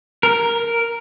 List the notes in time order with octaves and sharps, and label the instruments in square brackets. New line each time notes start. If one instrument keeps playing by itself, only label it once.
[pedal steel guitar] A#4